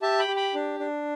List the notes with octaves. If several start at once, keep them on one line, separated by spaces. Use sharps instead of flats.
G4 E5 A5
G5 B5
G4
G5 B5
D4
D4